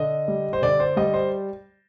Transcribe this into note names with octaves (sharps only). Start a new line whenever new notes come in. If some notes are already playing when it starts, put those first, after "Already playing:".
Already playing: D3 D#5
G3
C5
D3 D5
C5
G3 D#5
C5